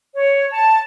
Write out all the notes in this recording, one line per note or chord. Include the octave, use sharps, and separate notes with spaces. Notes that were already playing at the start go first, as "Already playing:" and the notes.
C#5
A5